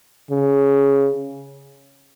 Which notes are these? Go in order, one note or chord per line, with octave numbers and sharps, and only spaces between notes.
C#3